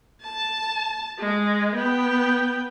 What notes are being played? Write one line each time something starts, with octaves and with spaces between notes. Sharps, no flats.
A5
G#3
B3 G5